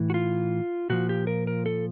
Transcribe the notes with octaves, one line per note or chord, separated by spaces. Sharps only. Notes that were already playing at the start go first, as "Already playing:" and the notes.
Already playing: A2 E3
F#4
F4
A#2 F3 F#4
G4
A#4
A#4
A4